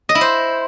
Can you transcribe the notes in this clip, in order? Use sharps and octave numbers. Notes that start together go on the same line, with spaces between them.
D#5
E4
C5